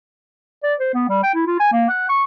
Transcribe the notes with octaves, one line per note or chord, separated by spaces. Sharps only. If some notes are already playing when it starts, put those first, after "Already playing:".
D5
C5
B3
G3
G5
E4
F4
G#5
A#3
F#5
C#6